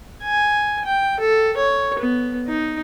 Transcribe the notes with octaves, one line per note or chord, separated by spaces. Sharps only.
G#5
G5
A4
C#5
B3
D#4